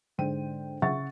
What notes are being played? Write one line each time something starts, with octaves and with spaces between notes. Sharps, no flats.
G#2 D3 C5 G5 D#7
C#3 E5 F#5 C#6 A6